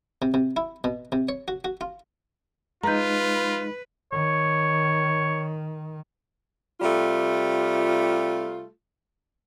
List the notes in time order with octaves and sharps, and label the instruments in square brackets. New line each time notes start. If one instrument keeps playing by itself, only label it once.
[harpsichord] C3
C3
E4
B2
C3
C#5
F#4
F#4
F4
[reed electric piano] G#3 D#4 [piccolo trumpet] F4 [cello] B4 [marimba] A#5 G6
[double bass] D#3 [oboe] C#5
[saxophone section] C3 G3 A3 F4